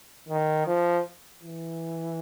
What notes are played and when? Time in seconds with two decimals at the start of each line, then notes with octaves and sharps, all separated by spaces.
0.29 D#3
0.67 F3
1.43 E3